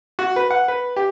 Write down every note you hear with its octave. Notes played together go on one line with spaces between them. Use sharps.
F#4
B4
F#5
B4
G4